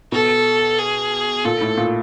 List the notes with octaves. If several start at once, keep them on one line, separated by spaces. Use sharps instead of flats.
B2 A4
G#4
A#2 A4
A2
A#2